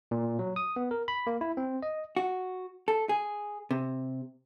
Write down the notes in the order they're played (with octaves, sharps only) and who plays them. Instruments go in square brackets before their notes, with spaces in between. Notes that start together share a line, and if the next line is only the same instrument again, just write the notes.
[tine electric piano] A#2
F#3
D#6
B3
A#4
B5
A#3
E4
C4
D#5
[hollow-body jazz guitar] F#4
A4
G#4
C3